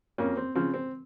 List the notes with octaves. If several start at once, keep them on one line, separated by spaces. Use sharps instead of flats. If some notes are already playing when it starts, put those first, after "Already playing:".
F2 A#3 C#4
C4
C#3 F3 C4
C4